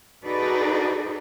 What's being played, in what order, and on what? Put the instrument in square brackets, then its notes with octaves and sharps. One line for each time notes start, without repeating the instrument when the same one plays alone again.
[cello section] D#4 F#4 G#4 A4 B4 D5